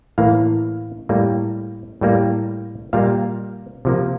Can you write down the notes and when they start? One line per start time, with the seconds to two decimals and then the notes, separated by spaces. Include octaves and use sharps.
0.18 A2 E3 A#3 F5
1.09 A2 G3 A#3
2.01 A2 G3 A#3
2.93 A#2 G3 A#3 F5
3.85 C3 F3 A#3